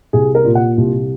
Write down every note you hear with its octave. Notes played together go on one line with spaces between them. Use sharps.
C2 G#4
A#4
A#2
F#5
C2